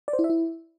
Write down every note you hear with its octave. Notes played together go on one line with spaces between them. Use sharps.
D5
C5
E4
E5
E4